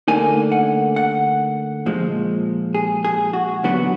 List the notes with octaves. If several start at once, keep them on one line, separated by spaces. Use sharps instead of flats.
D2 D3 F3 A#3 D#4 G#5
F#5
F#5
A#2 F3 G#3
G#4
G#4
F#4
D#2 D3 F#3 B3 F#4